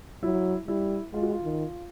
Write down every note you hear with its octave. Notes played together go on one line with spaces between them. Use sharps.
F#3 E4
G3 E4
G#3 F4
F#4
F4
D#3